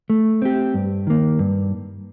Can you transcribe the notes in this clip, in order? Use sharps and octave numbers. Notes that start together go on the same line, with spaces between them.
A3
C4 G4
G2
D#3 A#3
G2